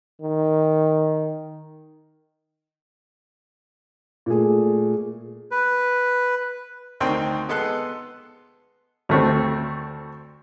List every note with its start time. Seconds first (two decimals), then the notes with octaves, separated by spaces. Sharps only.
0.21 D#3
4.26 A#2 A3 G#4
5.51 B4
7.00 D2 D#3 C4 G5 C6
7.49 G#3 B3 A4 C6 F#6
9.09 D2 A3 C4